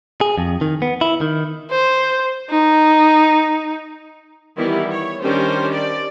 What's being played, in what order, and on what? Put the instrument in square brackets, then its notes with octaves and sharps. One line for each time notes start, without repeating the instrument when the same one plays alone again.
[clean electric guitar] G#4
F2
D#3
B3
E4
D#3
[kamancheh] C5
D#4
[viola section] D#3 E3 G3 B3 E4
C#5
D#3 G3 C#4 D4 G4 C5
D5